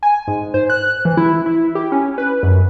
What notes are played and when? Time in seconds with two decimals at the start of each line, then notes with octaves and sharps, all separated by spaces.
0.03 G#5
0.28 G#2
0.54 C5
0.70 F#6
1.05 E3
1.17 E4
1.46 E4
1.75 G4
1.92 C#4
2.18 B4
2.43 F#2